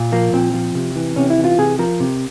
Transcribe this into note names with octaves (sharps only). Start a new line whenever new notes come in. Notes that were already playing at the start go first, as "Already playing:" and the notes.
Already playing: A#2
F3 A#3
A#2 C4
F3
C3
E3
C3 C#4
E4
E3
F4
C3 G#4
F3 A#4
C3